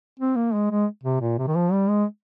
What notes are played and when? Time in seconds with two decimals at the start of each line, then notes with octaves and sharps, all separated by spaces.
0.20 C4
0.36 A#3
0.54 G#3
0.71 G#3
1.04 C3
1.21 A#2
1.38 C3
1.47 D#3
1.55 F3
1.72 G3
1.89 G#3